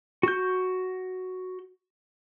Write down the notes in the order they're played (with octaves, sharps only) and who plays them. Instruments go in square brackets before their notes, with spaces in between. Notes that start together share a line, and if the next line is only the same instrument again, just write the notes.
[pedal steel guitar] F#4 G6